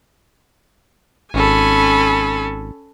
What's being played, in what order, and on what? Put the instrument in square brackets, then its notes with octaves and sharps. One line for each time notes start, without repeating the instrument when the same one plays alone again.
[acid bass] G#1 [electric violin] C#4 A4 [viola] G#5 B5